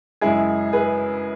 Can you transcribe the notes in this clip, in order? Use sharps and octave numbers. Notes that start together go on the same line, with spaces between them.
F#2 C#3 G#3 E4 G#4
G#4 B4